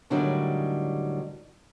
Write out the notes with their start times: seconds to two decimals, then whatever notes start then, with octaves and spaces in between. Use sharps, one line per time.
0.10 A2 D3 D#3 F#3 G3